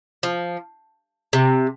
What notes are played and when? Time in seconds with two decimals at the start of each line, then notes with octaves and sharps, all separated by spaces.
0.23 F3
1.33 C3